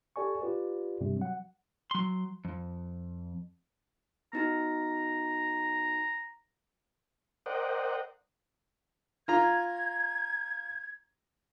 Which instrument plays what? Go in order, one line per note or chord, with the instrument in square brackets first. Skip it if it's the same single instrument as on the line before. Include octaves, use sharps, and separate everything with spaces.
[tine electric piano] G4 A4 D5 G#5 C#6
F4 G4 B4 D5
G2 C3 G3
F#3 F#5
[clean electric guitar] F#3 C6
F2
[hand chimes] B3 D#4 F#4 [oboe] A#5
[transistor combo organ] A#4 C5 D5 D#5 F#5 G5
[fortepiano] F4 A#5 [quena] G#6